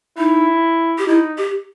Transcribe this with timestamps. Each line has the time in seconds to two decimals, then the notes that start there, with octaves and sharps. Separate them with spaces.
0.18 D#4 E4
0.98 G4
1.07 D#4 E4
1.38 G4